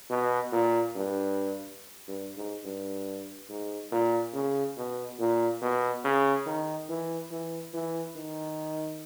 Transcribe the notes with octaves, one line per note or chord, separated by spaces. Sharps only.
B2
A#2
G2
G2
G#2
G2
G#2
A#2
C#3
B2
A#2
B2
C#3
D#3
E3
E3
E3
D#3